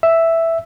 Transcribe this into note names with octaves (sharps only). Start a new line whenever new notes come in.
E5